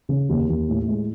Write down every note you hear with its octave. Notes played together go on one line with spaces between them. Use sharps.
C#3
D#2
D#2
A2
G#3